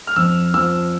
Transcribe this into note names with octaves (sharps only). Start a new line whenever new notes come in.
F6
F2 E6
F3 E6